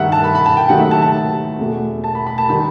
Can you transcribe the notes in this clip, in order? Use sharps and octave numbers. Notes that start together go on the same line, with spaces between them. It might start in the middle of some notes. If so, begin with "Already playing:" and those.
Already playing: G2 D#3 G3 E5 F#5
A5
B5
B5
A5
G5
D#2 D#3 F#3 A3 F#5
E5
A5
A5
E2 B2 A3
A5
B5
B5
A5
D#3 G3 B5